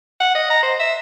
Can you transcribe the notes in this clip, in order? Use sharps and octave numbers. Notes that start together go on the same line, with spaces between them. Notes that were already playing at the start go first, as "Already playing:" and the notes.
F#5
D#5
A#5
C5
E5